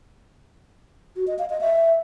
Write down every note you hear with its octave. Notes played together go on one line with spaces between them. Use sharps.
F#4
D#5
F5
D#5
E5